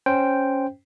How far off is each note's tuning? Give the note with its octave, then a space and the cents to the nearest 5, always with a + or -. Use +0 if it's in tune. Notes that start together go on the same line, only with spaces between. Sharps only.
C#4 +0 C5 +0 G5 +0